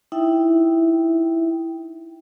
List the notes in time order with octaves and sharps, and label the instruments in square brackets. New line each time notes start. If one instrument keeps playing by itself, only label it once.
[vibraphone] D#4 E4 E5 G5